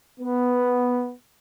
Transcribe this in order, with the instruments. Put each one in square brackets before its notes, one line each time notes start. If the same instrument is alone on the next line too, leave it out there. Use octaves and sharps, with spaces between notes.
[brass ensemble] B3